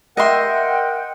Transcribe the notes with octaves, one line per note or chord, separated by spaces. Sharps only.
A#4 D#5 E5 F#5 G5 C6